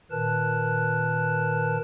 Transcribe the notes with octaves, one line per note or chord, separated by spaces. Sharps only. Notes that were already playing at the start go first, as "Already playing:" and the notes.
A#2 D#3 A#4 B4 A5 F#6